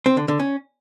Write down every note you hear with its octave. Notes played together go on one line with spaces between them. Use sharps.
C4
D3
D3
C#4